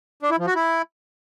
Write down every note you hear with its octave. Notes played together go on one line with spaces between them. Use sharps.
D4
E4
F3
F#4
E4